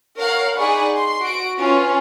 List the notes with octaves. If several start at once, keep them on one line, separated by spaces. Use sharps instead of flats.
A#4 C#5 F5 F#5
D#4 G#4 D5 F#5 B5 C#6
C6
F#4 D7
C#4 F4 B4